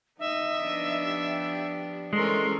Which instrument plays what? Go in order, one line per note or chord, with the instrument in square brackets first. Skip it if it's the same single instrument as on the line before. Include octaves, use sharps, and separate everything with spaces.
[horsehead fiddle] D#4 D#5 [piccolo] E5
[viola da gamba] F3 B3 D4
[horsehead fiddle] G4
[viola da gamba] E3 C#4 [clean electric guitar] G#3 [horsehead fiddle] A4 A#4 [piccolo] C6